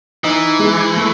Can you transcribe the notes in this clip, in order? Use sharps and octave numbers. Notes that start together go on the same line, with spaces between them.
E3 D#4
G#3
A3